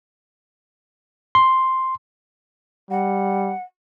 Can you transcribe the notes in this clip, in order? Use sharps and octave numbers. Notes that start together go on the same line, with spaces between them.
C6
G3 F#5